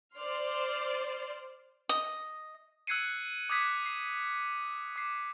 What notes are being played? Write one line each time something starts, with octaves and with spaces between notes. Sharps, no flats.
C5 D5 C6 F6
D#5
E6 F#6 G#6 C7 C#7 D#7
D6 D#6 F#6 G#6 B6 C#7
C7
D6 C7